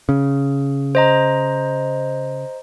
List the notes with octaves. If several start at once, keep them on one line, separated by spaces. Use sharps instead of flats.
C#3
C5 D#5 A#5